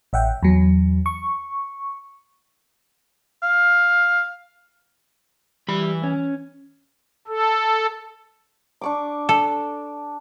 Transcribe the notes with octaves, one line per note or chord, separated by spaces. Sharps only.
A1 E5 F#5 G5
E2 F#3
C#6
F5
E3 G3 B5
C#4
A4
D4 C#6 D6
A4